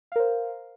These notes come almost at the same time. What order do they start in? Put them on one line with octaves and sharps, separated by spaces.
F5 A#4 C5